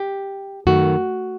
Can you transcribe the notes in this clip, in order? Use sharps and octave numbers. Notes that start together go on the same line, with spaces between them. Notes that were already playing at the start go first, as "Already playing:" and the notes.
Already playing: G4
F#2 D#3 A3 F#4